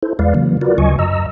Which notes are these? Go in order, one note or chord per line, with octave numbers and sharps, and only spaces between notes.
E4 A4 C5
E2 G#3 B4 D5 F5
C#3 E3 F#3 A#3
F4 F#4 A#4 B4 D5
D2 C#3 F#3 D#5 G#5 C#6
F#2 D#5 A#5 E6